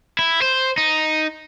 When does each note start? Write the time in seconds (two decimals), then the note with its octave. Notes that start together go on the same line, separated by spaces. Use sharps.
0.19 E4
0.42 C5
0.77 D#4